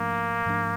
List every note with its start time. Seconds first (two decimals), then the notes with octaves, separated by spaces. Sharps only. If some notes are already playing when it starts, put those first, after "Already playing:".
Already playing: G#2 F3 A3 A#3 D4
0.46 G#2 F3 A3 D4